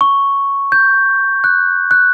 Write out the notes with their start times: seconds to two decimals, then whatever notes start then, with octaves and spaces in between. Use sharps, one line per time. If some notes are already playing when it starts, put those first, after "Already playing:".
0.01 C#6
0.72 G6
1.44 F#6
1.91 F#6